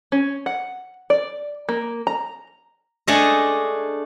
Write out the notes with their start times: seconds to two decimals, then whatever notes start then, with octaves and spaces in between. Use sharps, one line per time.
0.12 C#4
0.46 F#5
1.10 D5
1.69 A#3
2.07 A#5
3.07 A3 D4 G#4 C#5 D#5